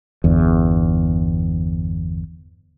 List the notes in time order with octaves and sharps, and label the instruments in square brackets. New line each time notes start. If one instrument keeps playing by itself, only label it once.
[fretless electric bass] G1 E2